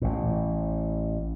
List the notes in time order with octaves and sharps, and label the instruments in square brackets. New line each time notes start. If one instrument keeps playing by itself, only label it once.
[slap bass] A1 A2